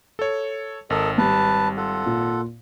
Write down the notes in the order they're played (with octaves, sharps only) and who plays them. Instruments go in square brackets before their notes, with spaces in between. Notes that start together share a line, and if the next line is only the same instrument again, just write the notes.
[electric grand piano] A4 C#5
[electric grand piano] G#1 [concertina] A4 A#4 D#5
[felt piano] G3 [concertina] B4 A5
[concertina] F4 A4 F#5
[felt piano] A#2